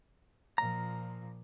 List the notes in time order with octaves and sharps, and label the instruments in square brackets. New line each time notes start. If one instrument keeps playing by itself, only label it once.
[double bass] A#2 F3 [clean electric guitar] A#5